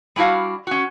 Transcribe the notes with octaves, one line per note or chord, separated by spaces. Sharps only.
G3 D4 E4 F#4 F5
C#4 F#4